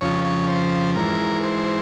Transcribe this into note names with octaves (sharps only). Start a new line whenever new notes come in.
F2 C#3 F3 C#5
C#5
C5
G#2 E3 A#4
C5